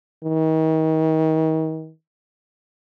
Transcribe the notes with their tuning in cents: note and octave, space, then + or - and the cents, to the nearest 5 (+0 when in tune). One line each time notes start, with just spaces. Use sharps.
D#3 +35